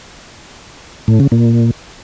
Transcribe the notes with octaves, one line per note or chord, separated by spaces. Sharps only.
A2
C#3
A#2